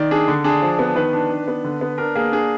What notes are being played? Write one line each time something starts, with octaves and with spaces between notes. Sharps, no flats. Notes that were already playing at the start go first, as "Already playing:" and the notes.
Already playing: D#3 D5
D4 G#4
D3
D4 G#4
F3
B3
D#3 B4
D4
D4
B3
D3
B3
D4 A#4
A#3 G#4
D4 G#4